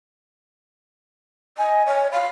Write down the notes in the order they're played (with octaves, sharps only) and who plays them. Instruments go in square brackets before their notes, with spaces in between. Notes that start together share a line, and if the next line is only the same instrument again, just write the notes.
[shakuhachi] D#5 [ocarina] G#5
[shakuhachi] C#5
[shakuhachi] F5 [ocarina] B5